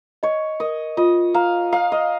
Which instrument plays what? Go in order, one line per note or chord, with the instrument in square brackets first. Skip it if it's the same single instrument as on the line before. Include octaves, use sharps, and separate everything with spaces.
[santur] C#5 [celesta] D#5
[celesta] A#4 [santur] D#5
[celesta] F4 [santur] D#5
[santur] F5 [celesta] A#5
[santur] F5 [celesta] A#5
[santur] D#5